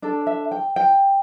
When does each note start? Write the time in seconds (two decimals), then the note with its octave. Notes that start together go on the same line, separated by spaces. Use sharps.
0.02 D4 A4 D5
0.27 E5
0.51 G5
0.76 G5